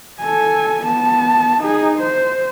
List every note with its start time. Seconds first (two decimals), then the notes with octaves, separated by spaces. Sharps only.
0.22 A4 G#5
0.84 B3 A5
1.62 D#4 G#4
1.99 C5